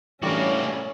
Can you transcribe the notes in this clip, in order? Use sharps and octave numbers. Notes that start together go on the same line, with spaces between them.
A2 E3 G3 A#3 C#4 D4 F#4